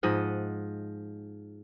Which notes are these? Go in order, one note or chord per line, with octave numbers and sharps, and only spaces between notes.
G#2 F3 D#5 F#5